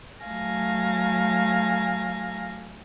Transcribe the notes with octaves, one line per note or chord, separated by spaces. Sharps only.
F#3 A3 F5 G#5 A#6